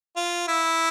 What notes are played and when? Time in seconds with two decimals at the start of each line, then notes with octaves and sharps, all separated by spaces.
0.16 F4
0.48 E4